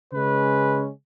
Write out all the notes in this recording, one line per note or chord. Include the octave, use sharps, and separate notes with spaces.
C#3 G#3 C#4 B4